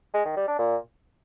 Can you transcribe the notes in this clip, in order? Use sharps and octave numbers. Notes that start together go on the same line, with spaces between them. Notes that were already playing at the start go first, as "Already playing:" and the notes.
G#3
D#3
G3
D4
A#2